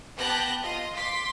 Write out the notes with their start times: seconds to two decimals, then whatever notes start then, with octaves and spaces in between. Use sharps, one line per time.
0.18 B3 G4 A5 F#6 G6 A#6
0.63 F4 D#5
0.96 C6 D6 B6